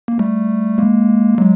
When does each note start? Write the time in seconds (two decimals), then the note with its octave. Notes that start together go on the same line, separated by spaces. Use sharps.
0.08 A#3
0.19 G3 A3
0.78 G#3 A#3
1.38 F#3 G#3